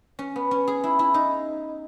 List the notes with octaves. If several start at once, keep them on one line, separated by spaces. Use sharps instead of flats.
C#4
B3
C#4
G#4
E4
E4
D#4